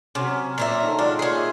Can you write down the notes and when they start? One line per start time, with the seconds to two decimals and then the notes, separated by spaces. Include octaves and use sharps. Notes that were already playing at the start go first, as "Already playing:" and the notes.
0.15 C3 F#3 C#4
0.58 A#2 A#4 E5
0.83 D#3 A4
0.99 G#3 D4 F4
1.19 A#2 C#4 G#4
1.37 E5